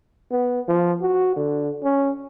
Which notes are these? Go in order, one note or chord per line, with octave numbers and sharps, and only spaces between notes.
B3
F3
F#4
D3
C#4